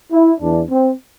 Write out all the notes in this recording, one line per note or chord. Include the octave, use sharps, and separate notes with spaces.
E4
E2 E3 D4
C4